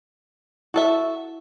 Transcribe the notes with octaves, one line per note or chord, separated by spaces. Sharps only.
E4 F#4 A4 E5